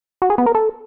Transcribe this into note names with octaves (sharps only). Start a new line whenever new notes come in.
F#4
G#4
B3
A#4
A4